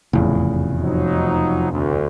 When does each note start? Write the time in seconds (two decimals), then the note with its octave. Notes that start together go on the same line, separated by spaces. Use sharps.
0.13 F1 E2 A2 C#3
0.83 F3 F#3 D#4
1.71 D2